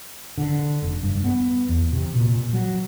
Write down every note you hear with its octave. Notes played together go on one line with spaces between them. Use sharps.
D3
F1
G2
B3
E2
C3
A#2
F#3